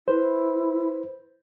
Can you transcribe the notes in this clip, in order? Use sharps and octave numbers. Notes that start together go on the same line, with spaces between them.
E4 B4 C5